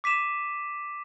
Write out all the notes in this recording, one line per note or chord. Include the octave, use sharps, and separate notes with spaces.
D6 B6 D#7 E7